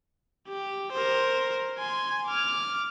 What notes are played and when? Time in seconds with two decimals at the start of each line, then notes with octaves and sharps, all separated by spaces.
0.48 G4
0.93 A#4 C5
1.78 G#5 C6
2.27 D6 F6